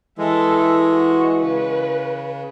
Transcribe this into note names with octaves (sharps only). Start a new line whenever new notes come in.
E3 G#3 A4 E5
F#4
C#3 B4